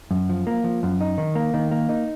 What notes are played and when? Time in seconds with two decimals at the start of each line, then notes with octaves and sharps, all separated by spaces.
0.11 F#2
0.29 F3
0.47 A#3
0.64 F3
0.83 F#2
1.01 D#4
1.18 D#3
1.35 A#3
1.54 D#3
1.71 A#3
1.89 D#4